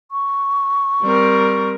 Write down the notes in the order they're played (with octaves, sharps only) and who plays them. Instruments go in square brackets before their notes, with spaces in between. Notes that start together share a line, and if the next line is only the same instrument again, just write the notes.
[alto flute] C#6
[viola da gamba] G3 C4 A#4